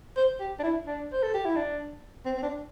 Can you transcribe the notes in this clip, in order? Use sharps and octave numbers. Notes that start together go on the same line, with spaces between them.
C5
G4
D4
E4
D4
C5
A4
G4
E4
D4
C4
C4
D4